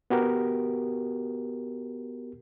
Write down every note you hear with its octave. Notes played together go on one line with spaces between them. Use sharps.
B3 F#4 G4 A#4